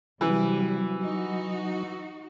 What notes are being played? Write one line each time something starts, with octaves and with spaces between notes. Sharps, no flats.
C3 E3 F#3 G3 B4
D#4 F#4